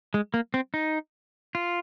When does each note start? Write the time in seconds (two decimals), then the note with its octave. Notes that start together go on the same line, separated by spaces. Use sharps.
0.14 G#3
0.34 A#3
0.54 C4
0.74 D#4
1.55 F4